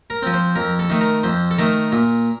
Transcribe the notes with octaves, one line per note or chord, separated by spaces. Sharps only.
A#4
F3 C4
C5
F2 A#4
A4
D#3 A3
A#4
F2 C5
A4
D#3 A3 A#4
A#2